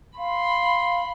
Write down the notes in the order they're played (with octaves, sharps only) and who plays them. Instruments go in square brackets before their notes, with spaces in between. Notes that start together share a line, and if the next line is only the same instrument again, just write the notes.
[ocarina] F5 [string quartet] B5 [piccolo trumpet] C6